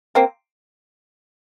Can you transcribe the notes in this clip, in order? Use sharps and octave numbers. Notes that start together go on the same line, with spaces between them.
A#3 C4